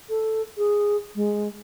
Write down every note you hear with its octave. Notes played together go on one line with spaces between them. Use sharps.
A4
G#4
G#3